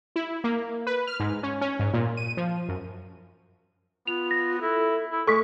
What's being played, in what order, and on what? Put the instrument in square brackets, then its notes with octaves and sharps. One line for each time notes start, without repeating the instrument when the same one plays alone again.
[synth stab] E4
A#3
B4
F6
G#2
C#4
C#4
G#2
A#2
D#7
F3
F#2
[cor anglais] B3 [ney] F4 [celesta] F7
[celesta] A#6
[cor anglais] E4 [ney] A4
[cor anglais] E4
[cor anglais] G#3 [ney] A3 [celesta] A4 B6 [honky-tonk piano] C#6